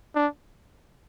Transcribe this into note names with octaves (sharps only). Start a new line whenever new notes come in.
D4